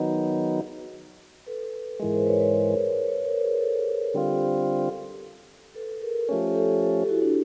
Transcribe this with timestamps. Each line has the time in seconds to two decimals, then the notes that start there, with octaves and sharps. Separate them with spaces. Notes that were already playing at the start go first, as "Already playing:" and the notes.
Already playing: D#3 F#3 B3 D#4
0.13 F#4 G#4
1.47 A4 B4
1.99 G#3 G#4 A#4
2.02 G#2 E3
2.13 A#4 C5
2.27 B4 C#5
2.40 B4 C#5
3.07 B4 C#5
3.25 A#4 C5
3.43 G#4 A#4
3.60 A4 B4
4.14 D3 G3 C4 F4 G4 A4
5.75 A4 B4
6.02 G#4 A#4
6.29 F3 A3 C#4 G4 A4
6.55 G4 A4
6.82 G4 A4
7.04 G4
7.09 E4 F#4
7.22 D4